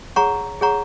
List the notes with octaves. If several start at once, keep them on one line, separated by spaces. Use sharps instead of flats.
G#4 C#5 F#5 A#5 C#6
G#4 C#5 F#5 A#5 C#6